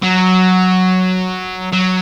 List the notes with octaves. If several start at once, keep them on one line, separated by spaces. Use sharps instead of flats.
F#3
F#3